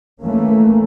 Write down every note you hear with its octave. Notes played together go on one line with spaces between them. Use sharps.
E3 A3 A#3 C#4